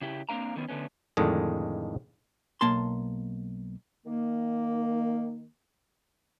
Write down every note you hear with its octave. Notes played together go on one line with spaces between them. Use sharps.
C#3 E4 G4
A#3 C4 D4 F5 A#5
D3 D#3 B3 C#4
D3 A3 B3 C#4
F2 A2 D3 D#3 G#3
B1 A#3 A5 C6
D#3 A#3